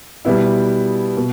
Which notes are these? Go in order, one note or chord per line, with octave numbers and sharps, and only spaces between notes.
B2 G3 B3 E4
B2